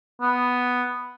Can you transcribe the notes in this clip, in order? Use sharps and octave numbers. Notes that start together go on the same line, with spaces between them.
B3